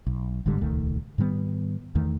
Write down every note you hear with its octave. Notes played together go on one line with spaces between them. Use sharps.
B1
G1 G#2 D3 G3
D#1 C#2 D#3 A3
G#2 D#3 G3 B3
E2 D#3 A3